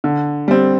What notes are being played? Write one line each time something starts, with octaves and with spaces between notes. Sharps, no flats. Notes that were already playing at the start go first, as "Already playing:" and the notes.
D3
G3 C4